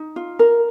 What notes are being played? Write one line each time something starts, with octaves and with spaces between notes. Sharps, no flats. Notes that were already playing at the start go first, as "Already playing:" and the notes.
Already playing: D#4
F4
A#4